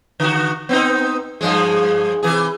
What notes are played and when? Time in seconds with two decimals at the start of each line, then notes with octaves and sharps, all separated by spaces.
0.20 D3 F#4
0.69 B3 C4 D#4
1.41 G2 F3 G#3
2.23 C3 E3 G#4